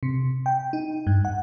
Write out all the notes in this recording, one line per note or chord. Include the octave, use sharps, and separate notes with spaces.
C3
G5
D#4
G2
F#5